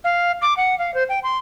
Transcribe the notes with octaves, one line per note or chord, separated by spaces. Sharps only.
F5
D6
F#5
F5
C5
G5
C6